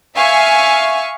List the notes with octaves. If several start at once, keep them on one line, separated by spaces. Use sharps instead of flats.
E5 F5 G#5 C#6